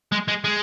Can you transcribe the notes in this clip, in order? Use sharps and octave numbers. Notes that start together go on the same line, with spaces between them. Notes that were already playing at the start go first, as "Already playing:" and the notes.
G#3
G#3
G#3